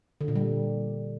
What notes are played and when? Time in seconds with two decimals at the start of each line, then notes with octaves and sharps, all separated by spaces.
0.21 D3
0.28 A#2
0.35 G3